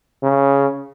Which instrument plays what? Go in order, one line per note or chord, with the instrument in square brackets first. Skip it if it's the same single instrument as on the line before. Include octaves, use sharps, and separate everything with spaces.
[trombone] C#3